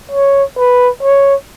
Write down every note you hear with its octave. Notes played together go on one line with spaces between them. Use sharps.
C#5
B4
C#5